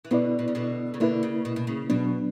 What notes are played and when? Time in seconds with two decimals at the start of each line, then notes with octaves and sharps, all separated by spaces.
0.05 E3
0.11 B2 D3 B3 E4 B4 D5
0.39 B2
0.48 C#3
0.55 B2 D3
0.94 C#3
1.00 B2 D3 A#3 E4 B4
1.23 C#3
1.45 B2
1.56 B2
1.67 C#3
1.90 B2 F#3 B3 D4